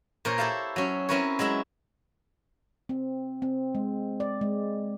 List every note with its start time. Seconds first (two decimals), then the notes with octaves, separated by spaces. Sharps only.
0.25 A#2 A#4 C5 C#5
0.38 E4 G4 A4 E5 F5
0.76 F#3 C#4
1.09 C4 C#4 E4 A#4 B4 C#5
1.39 F#3 G#3 E4 E5 B5
2.89 C4
3.42 C4
3.75 G#3
4.20 D5
4.41 G#3